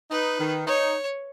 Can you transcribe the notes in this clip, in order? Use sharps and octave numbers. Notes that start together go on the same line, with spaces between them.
D#4 B4
D#3
D#4 C#5